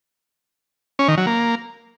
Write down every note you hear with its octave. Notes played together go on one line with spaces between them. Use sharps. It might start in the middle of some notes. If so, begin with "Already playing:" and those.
C#4
D#3
F#3
A#3